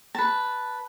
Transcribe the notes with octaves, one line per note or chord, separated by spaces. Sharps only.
B4 A5